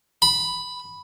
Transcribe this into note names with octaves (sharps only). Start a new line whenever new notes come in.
B5